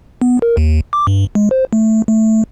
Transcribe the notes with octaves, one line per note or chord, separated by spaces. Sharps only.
B3
A#4
D#2
D6
G2
G#3
C5
A3
A3